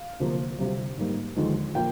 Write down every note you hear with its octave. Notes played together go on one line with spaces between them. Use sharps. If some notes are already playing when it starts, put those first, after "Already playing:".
Already playing: F5
D2 C3 F3 A#3
D2 C3 G3
G#2 G3 A#3
D#2 D3 F3 G#3
A#2 F3 A#3 G5